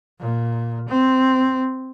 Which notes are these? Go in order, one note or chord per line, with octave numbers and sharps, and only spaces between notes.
A#2
C4